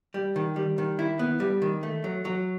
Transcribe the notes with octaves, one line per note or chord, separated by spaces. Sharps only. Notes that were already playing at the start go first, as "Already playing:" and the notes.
G3
D#3
G3
D#3
E4
B3
G3
D#3
A3
F#3
F#3